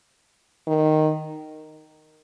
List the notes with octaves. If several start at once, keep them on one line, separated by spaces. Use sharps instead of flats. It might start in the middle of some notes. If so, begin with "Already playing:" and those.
D#3